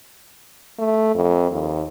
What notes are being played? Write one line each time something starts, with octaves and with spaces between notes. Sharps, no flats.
A3
F2
D#2